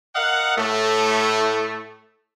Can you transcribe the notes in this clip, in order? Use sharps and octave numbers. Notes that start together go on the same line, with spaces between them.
A#4 D#5 F5 F#5
A2 A3